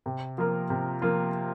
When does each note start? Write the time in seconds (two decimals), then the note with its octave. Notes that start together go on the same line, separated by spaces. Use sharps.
0.06 C3
0.38 F3 A#3 F4 A#4
0.70 C3
1.02 F3 A#3 F4 A#4